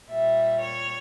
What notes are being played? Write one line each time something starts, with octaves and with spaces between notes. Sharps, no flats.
A#2 G3 E5
C#5